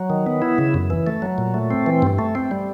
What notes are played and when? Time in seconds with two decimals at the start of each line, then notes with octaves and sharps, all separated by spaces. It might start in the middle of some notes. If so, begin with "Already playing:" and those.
Already playing: F#3
0.10 D#3
0.26 B3
0.42 E4
0.58 C#3
0.74 F#2
0.90 E3
1.07 A3
1.22 F#3
1.38 A#2
1.54 A3
1.71 C4
1.86 E3
2.02 G2
2.19 A3
2.35 C4
2.51 G3